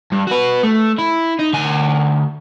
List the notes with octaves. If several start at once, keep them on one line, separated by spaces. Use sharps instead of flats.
G2
F#4 B4
A3
E4
D#4
D2 G#5